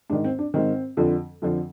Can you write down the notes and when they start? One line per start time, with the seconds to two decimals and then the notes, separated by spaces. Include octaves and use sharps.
0.10 G#2 D#3 D4
0.24 C4
0.39 D4
0.54 G#2 D#3 C4
0.97 F2 D3 F3
1.42 F2 D3 F3